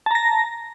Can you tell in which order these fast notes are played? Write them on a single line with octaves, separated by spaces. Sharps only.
A5 A#5 A#6